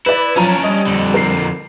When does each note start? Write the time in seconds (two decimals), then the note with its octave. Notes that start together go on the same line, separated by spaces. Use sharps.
0.06 E4 B4 D5
0.36 F3 F#3 C#4 D4 A#5
0.63 G3 D#5
0.87 F2 D3
1.14 A#4 C7